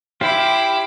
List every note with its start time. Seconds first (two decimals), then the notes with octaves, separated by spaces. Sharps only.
0.21 E4 G4 C5 F5 D6